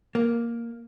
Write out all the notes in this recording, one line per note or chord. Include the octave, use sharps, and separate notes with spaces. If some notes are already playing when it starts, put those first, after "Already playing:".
A#3